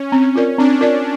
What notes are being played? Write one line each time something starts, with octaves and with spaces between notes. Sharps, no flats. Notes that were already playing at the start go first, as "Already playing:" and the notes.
Already playing: C#4
C4
F4 A#4 D5
C4 D4
F4 A#4 D5